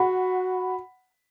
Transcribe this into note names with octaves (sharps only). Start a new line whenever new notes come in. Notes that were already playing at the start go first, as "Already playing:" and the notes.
Already playing: F#4 F#5 B5